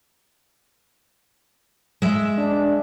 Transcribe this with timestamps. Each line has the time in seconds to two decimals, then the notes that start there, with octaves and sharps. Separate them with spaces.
2.02 G#3 E5
2.37 D4